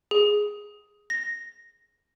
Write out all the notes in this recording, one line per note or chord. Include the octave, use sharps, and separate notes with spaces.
G#4
A#6